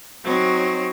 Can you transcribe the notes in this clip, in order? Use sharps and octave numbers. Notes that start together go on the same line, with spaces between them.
F#3 C4 D#4 C#5